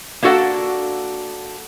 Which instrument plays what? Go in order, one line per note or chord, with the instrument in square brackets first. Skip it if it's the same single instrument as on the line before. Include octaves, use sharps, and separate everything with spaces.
[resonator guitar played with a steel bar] A#3 D4 F#4 A4 D5 F#5